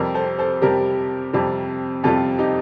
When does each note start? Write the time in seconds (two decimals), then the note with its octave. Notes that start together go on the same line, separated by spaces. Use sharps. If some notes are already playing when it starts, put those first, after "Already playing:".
Already playing: F2 C3 G3 G4 A#4
0.15 A4 C5
0.39 A4 C5
0.62 F2 C3 G3 G4 A#4
1.33 F2 C3 G3
2.04 F2 C3 G3 F4 A4
2.39 D#4 G4